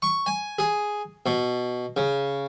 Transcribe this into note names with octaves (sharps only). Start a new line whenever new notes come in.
C#6
G#5
G#4
B2
C#3